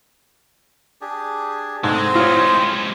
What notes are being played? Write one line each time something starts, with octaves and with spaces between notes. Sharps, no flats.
D4 G4 G#4
G#2 G#3 A3 C4 C5 D#5
G3 G#3 F4 C#5